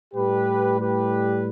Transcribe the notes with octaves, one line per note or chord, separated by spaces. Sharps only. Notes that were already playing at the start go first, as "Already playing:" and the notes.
A2 G3 G4 B4
G4 B4